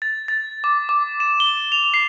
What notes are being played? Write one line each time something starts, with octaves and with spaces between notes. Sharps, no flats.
A6
A6
D6
D6
E7
G7
F7
C7